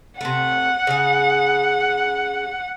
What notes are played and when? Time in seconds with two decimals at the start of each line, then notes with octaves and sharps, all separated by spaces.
0.21 C3 A3 F#5
0.87 C#3 G#4